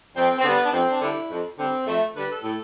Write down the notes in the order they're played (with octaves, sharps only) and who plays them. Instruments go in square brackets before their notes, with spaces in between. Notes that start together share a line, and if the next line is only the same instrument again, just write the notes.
[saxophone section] F2 C4
C4
D3 G3 B3
D4
F2 C4
D4
D3 G3 E4
F2
D3 G3 C4
F2 A3
D3 G3 B4
A4
A2